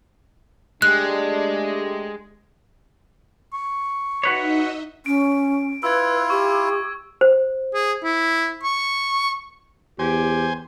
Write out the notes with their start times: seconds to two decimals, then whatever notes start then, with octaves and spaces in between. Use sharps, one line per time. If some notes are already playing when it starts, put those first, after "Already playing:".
0.82 G#3 A3 D4 G4 F#6
3.53 C#6
4.23 D#4 F#4 B4 C#5 D#5 E5
5.06 C#4 D7
5.83 E4 F4 B4 E6 G#6
6.30 G4 C#6
7.21 C5
7.74 G#4
8.03 E4
8.63 C#6
9.99 E2 G4 C5 G#5